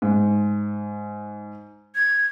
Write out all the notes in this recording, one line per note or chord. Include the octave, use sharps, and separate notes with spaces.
G#2
G#6